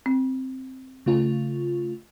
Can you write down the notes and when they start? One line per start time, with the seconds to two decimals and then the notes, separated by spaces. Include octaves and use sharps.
0.06 C4
1.06 C#3 A3 F4